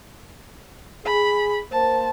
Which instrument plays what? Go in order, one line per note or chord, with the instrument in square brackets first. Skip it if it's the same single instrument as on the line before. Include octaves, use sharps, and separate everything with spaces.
[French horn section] G#4 [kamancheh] B5
[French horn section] A#3 C5 [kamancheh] A5